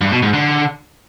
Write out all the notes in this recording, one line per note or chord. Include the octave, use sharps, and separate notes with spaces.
G2
B2
G#2
D3